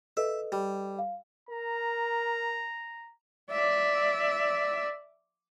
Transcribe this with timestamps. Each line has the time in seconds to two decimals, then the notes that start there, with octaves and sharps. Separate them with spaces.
0.17 A4 B4 D#5 E5
0.52 G3
0.99 F5
1.49 A#4 A#5
3.50 D5 E5